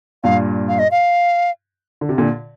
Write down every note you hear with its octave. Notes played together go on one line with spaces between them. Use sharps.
G2 A#2 F5
F5
D#5
F5
D3
C3
A#2 D3